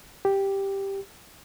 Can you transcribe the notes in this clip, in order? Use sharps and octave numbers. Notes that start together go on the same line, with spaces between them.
G4